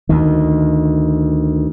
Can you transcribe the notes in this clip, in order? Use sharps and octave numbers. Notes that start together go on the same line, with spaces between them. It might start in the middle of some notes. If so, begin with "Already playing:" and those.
D2 D#3